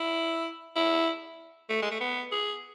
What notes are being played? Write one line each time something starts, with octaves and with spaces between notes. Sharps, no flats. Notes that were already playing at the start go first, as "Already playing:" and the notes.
Already playing: E4
E4
A3
G#3
A3
B3
G#4